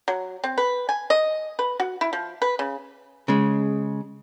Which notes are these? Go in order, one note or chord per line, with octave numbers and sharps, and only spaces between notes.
F#3
C4
B4
G#5
D#5
B4
F#4
E4
F3
B4
C#3
C#3 G#3